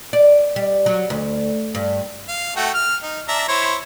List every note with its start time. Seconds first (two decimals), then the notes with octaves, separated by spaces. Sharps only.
0.13 D5
0.56 G3
0.86 F#3
1.10 D2
1.75 G2
2.28 F5
2.56 A3 F#4 G5
2.74 F6
3.03 D#4
3.28 D4 E5 A#5
3.48 E4 C5 C#5